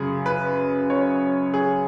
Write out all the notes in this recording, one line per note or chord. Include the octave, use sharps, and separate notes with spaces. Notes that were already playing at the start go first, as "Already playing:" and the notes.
Already playing: F#2 C#3 G#4
B4
C#5
G#4